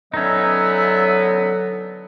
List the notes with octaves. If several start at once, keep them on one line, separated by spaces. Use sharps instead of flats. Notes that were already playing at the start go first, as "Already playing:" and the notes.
D3 F#3 B3 C#4 D#4 E5